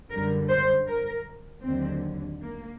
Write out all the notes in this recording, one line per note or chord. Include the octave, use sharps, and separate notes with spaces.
F#2 D3 G3 A#4
C5
A#4
D#2 D3 F#3 C4
A#3